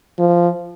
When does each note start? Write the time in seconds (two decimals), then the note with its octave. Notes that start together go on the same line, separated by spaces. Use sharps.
0.19 F3